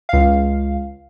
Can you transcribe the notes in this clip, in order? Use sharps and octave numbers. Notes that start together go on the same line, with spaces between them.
C#2 F5